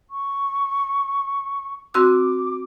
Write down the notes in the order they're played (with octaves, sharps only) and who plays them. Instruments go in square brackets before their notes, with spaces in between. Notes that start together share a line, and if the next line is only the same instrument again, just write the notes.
[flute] C#6
[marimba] C4 F#4 E6 [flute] D6